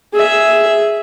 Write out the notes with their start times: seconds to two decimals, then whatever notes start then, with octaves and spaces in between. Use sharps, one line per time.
0.13 G#4 E5